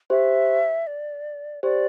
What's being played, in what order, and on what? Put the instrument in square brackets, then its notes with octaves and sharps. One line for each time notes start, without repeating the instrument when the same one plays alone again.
[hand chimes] G4 C5 [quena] E5
[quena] D5
[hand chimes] G4 C5 [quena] D5